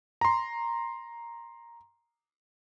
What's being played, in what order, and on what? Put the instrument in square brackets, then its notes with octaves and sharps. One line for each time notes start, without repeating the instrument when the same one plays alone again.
[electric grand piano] A#5 C6